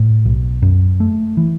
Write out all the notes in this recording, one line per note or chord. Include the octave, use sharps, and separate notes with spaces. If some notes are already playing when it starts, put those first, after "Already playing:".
Already playing: A2
B1
F#2
A3
E3